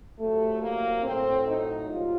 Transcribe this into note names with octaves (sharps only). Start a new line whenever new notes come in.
C2 C3 F#3 A3
A#3
A2 F#3 C4
D#4
C2 A#2 F#3 F4